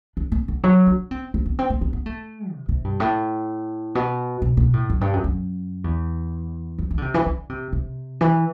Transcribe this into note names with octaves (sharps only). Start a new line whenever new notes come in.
D4
C4
D3
F#3
D4
C4
C4
B3
C4
C4
B3
B3
A3
C3
C3
G2
A2
B2
B2
B2
A2
F#2
G2
F#2
F#2
E2
F#2
E3
D3
C3
E3
D3
C3
C3
E3